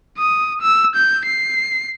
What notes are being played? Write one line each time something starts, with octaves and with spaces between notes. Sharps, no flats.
D#6
E6
G6
C7